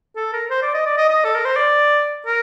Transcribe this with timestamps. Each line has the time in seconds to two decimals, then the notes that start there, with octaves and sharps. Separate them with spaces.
0.16 A4
0.33 A#4
0.50 C5
0.62 D5
0.74 D#5
0.86 D5
0.97 D#5
1.09 D#5
1.25 A4
1.35 A#4
1.45 C5
1.56 D5
2.26 A#4